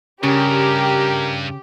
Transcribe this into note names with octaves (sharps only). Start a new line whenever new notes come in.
G2 C#3 G4 A#4